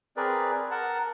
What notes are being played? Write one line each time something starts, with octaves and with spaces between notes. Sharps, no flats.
C4 G#4 A#4 B4 D5
A#4 F#5 A5